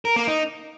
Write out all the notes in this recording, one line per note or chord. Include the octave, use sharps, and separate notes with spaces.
A#4
A#3
D#4